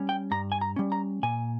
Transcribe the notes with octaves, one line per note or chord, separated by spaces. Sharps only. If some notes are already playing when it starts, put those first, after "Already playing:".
Already playing: G3 C#4
G5
G2 A#5
G#5
A#5
G3 C#4
A#5
A#2 G#5